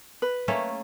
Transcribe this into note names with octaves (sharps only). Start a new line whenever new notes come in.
B4
A3 A#3 C#4